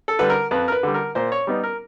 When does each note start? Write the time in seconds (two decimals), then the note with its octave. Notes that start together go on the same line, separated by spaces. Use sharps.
0.08 A4
0.19 D3 G3 B4
0.30 A#4
0.51 F2 B4
0.68 A#4
0.72 B4
0.83 D3 G3
0.94 A#4
1.15 A#2 C5
1.32 C#5
1.47 G3 B3 D#4
1.63 A#4